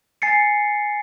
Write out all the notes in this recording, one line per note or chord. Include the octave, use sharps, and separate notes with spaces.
G#5 A6 C7 C#7